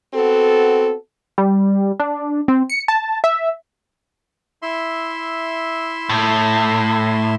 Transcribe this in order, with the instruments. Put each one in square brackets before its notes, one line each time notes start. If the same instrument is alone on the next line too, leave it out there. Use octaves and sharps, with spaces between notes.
[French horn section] B3 C4 F#4 A4
[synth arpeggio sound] G3
D4
C4
C#7
A5
E5
[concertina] E4 E5 C6
[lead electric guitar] A2